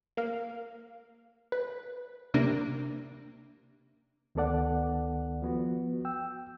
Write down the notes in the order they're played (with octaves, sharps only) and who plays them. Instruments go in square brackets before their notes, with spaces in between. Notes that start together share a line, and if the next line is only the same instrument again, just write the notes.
[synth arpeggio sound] A#3 F5
B4
C3 G3 A#3 D4
[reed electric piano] D2 D#3 B3 A4 D5 F#5
F3 B3 F#4
G5 E6